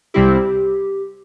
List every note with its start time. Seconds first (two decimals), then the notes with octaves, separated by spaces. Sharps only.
0.14 C2 C3 G3 C4 E4 G4